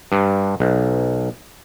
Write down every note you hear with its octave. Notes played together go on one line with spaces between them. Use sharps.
G2
B1